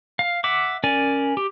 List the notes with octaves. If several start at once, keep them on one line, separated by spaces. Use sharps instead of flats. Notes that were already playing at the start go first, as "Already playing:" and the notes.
F5
E5 F#5 D6
C#4 A#4 D5 G#5
G4